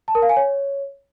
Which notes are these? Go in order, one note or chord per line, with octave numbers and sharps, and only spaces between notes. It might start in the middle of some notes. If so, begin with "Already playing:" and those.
A5
A#4
F5
G#5
C#5